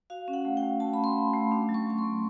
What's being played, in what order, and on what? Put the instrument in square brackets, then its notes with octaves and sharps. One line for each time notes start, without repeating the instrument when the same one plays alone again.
[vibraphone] F#4 F5
C#4
F#5
A3
G5
A3
A3 A5
C#4 B5
C6
C#4
A3
D4
F#3
C#6
F#3 C#6
C6
B3